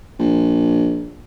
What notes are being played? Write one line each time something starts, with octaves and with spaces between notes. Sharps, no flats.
A#1